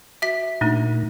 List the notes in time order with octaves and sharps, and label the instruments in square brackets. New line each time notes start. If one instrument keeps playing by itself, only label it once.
[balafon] F#4 [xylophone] E5 B6
[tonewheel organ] A#2 [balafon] A3 D4 D#4